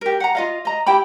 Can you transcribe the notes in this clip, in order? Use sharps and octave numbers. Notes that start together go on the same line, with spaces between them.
G4 A#4
F#5 A#5
F4 D#5 F5
D#5 A#5
E4 G4 G5 B5